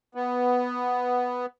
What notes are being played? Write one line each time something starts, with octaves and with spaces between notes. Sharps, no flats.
B3